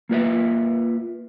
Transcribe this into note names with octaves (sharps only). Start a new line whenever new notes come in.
A#3 F4 B4 E5